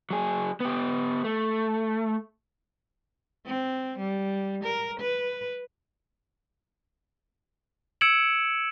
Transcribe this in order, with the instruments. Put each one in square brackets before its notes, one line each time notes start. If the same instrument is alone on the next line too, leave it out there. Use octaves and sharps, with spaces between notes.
[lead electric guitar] F#3 G#4
B3 G4
A3
[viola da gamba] C4
G3
A#4
B4
[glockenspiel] E6 G#6 C#7 D7 E7 F#7